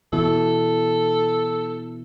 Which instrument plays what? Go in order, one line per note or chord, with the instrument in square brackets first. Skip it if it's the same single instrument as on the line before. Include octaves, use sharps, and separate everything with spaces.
[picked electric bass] B2 E3 [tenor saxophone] A4